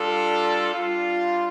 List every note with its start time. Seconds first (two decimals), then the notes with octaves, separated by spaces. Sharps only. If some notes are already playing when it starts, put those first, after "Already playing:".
Already playing: G3 D4 F4 A4 D5
0.73 G3 D4 F4